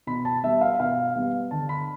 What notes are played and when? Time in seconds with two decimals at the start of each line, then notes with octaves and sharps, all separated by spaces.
0.07 B2 B5
0.25 A5
0.43 G3 B3 E5
0.61 F5
0.80 B2 F5
1.16 G3 B3
1.51 D3 A5
1.69 B5